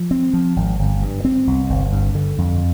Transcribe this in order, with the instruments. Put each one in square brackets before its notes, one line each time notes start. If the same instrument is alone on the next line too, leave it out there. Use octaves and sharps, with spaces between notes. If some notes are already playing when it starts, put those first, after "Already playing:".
Already playing: [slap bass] F3
C4
F3
G#1
G1
G2
C4
C2
G1
G2
D3
F2